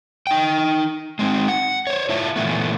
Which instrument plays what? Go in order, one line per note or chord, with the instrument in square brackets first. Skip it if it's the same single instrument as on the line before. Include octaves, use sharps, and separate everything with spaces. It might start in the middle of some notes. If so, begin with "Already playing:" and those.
[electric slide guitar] D#4 G5
G#3 C4 D#4
F#5
C5 C#5
E4 F4 E5 A5
A#2 E3 A3 B3